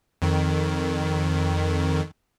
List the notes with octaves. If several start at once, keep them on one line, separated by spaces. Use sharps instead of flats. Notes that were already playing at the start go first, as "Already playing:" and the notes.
F2 D#3